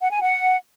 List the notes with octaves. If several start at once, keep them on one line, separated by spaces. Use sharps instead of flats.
F#5
G#5
F#5